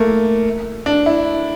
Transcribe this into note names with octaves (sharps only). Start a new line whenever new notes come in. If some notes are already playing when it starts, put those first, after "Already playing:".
Already playing: A3 A#3
D4
E4